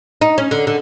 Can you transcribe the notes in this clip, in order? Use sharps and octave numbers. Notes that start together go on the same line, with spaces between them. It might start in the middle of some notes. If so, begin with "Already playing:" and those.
D#4
C#4
D3
D3